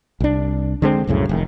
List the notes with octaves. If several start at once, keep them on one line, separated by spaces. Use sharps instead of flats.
C2 D4
D3 G#3 C4
C2 F#2 A2 C#3
F1 A2 D#3